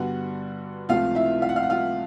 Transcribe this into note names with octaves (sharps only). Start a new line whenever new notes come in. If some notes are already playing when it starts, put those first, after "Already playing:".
Already playing: G2 D3 G3 B3 F#4 F#5
C#2 C3 F3 A3 F4 F5
E4 E5
F5
F#5
F5
F#5
F4 F5